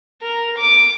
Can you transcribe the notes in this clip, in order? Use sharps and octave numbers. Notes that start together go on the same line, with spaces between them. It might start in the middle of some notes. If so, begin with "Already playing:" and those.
A#4
D6